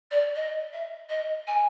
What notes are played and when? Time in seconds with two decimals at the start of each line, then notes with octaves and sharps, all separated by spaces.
0.11 D5
0.35 D#5
0.72 E5
1.09 D#5
1.47 G#5